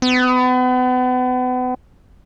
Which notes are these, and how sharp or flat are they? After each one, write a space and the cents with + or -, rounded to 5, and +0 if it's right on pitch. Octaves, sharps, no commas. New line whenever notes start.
B3 +35